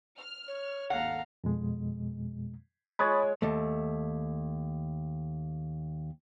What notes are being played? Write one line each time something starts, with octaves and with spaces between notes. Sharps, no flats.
F6
C#5
G#1 D#2 A4 F5 F#5 A#5
F2 B2 G#3
G#3 C#5 B5 D#6 A6
D#2 A3